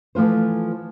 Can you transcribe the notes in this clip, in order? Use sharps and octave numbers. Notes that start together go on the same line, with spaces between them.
E3 F3 A3 F4 C5